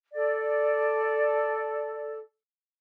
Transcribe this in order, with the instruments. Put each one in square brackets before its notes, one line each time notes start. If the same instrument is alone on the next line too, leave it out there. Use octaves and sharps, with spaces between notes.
[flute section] A4 D5